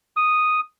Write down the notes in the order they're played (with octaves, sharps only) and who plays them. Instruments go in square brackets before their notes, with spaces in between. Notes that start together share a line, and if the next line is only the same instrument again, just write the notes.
[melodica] D#6